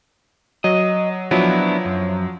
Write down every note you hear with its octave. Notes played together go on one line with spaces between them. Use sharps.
F#3 D#5
F3 F#3 B3 D4 E4
F#2